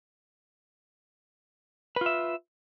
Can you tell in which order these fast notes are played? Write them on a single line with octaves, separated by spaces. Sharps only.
B4 F4 E5